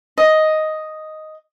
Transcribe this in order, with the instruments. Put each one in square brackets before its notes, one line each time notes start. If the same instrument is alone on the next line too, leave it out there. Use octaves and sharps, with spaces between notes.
[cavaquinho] D#5